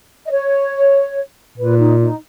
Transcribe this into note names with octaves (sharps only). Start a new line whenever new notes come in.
D#5
C#5
A#2 B4
D#4
D#4